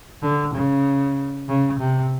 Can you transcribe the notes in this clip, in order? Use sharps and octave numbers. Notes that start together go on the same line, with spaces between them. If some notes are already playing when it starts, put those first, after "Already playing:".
D3
C#3
C#3
C3